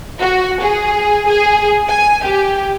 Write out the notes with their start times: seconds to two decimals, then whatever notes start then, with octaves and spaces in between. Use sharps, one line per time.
0.21 F#4
0.61 G#4
1.27 G#4
1.88 G#5
2.23 G4